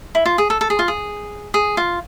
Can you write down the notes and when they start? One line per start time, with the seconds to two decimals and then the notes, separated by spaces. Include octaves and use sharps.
0.15 E4
0.26 F4
0.38 G#4
0.50 A4
0.61 A4
0.70 G#4
0.79 F4
0.88 G#4
1.54 G#4
1.77 F4